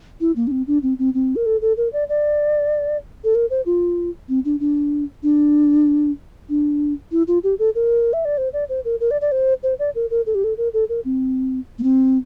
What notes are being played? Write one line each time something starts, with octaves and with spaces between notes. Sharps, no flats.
E4
A#3
D4
C4
D4
C4
C4
C4
A#4
A4
A4
A#4
D5
D5
A4
A#4
C5
F4
C4
D4
D4
D4
D4
E4
F4
G4
A4
A#4
E5
D5
C5
D5
C5
A#4
A#4
D5
D5
C5
C5
D5
A#4
A#4
A4
G4
A4
A#4
A4
A#4
C4
A#3
C4